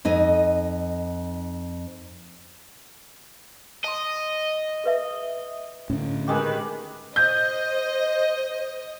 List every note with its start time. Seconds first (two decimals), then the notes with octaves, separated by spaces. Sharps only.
0.05 F2 D#4 D#5
3.84 D#5 A5 C6
4.84 G#4 B4 E5
5.90 A2 D3 C#4
6.27 D#3 G#3 G4 B4
7.16 C5 D#5 G6